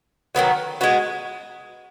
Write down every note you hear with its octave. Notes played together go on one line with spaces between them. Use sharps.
D#3 F#3 B3 F#4
G#3 B3 F#4